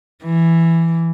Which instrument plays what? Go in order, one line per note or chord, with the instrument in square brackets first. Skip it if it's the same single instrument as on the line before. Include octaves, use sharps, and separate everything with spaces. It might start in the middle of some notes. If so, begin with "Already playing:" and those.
[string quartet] E3